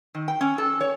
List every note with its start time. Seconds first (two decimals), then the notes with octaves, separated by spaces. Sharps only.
0.15 D#3
0.28 G5
0.41 C#4
0.58 A4
0.81 C#5